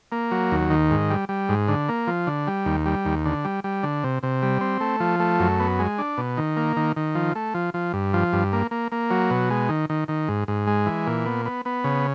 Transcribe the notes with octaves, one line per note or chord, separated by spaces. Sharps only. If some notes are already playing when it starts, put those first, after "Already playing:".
A#3
F#3
D#2
D#3
G#2
G3
G3
G#2
D3
A#3
F3
D3
G3
D#2
G3
D#2
D3
G3
G3
D3
C3
C3
G3
C4
A3
F3
A3
F#2
B3
G#3
D4
B2
D#3
A#3
D#3
D#3
F3
A3
F3
F3
G2
F3
G2
A#3
A#3
A#3
F#3
B2
G#3
D#3
D#3
D#3
G#2
G#2
G#3
E3
A#2
B3
B3
B3
C#3